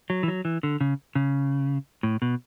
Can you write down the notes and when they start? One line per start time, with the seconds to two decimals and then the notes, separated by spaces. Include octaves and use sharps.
0.10 F#3
0.23 E3
0.28 F#3
0.45 E3
0.63 D3
0.81 C#3
1.15 C#3
2.03 A2
2.22 B2